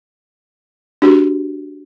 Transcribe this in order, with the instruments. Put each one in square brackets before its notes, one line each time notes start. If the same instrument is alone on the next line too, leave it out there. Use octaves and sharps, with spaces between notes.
[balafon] D4 F#4 G4